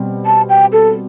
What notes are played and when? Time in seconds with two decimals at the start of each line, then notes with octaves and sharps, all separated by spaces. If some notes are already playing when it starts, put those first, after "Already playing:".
Already playing: B2 G3 C4
0.26 A5
0.49 G5
0.73 A4